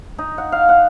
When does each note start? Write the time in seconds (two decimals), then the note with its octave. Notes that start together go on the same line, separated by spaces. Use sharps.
0.18 D#4
0.38 F#5
0.52 F5
0.69 F#5